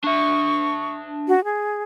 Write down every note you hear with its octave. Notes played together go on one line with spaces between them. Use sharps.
D4 E5 C#6
F#4
G#4